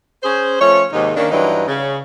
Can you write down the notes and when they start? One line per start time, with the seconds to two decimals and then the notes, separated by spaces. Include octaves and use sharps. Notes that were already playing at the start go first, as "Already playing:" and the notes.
0.23 C#4 G#4 C5
0.61 F3 A3 C#4 C#5
0.92 D#2 G#2 C3 G#3 D#4
1.16 D#2 D#3 A#3 C#4 D4
1.31 G2 E3 F#3 D4 D#4
1.67 C#3